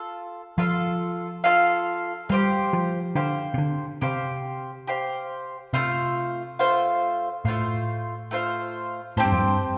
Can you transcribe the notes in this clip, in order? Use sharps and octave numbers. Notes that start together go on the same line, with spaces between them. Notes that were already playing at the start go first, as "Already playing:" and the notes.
Already playing: F4 A4 F5
F3 F4 A4 F5
F4 A4 F5
G3 G4 C5 F5
F3
D3 G4 C5 F5
C3
D3
C3 G4 C5 F5
G4 C5 F5
C3 A3 F4 C5 F5
A3 F4 C5 F5
A2 A3 F4 C5 F5
A3 F4 C5 F5
A2 C4 G4 C5 A5
G2
F2
G2